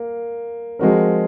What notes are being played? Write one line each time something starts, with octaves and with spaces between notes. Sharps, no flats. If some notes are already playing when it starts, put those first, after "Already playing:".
Already playing: A#3
F3 G#3 C4 F#4 A#4